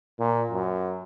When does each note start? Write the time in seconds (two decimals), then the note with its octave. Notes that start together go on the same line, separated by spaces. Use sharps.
0.19 A#2
0.51 F#2